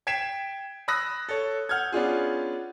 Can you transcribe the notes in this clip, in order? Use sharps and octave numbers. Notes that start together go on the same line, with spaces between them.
G5 G#6 B6 C7 D7 E7
B5 D#6 E6 F#6 A#6
A4 C#5
F#5 F6 G6 G#6
B3 C#4 D4 F4 G#4